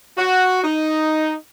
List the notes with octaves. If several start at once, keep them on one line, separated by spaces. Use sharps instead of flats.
F#4
D#4